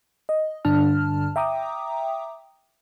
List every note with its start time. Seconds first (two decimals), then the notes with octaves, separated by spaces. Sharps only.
0.29 D#5
0.65 G2 D3 D4 A5 F6
1.36 E5 G5 A#5 D6 D#6